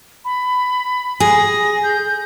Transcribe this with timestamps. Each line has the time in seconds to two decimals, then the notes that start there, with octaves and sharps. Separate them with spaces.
0.25 B5
1.20 G#4 A#6
1.83 G6